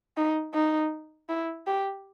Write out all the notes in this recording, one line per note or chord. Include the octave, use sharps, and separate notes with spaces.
D#4
D#4
E4
G4